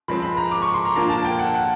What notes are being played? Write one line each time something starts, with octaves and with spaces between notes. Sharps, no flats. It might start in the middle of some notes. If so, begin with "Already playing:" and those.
F3 G#3 C4 B5
B5
A#5
D6
C#6
C6
A#5
A#2 F3 A#3 D4 A#5
A5
G5
F#5
F#5